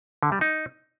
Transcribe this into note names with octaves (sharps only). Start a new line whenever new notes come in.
D3
G3
D#4